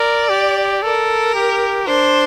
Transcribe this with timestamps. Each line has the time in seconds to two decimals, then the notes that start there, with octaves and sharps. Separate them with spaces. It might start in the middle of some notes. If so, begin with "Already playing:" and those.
Already playing: A#4 D5
0.29 G4
0.83 A4 A#4
1.34 G4
1.87 D4 C5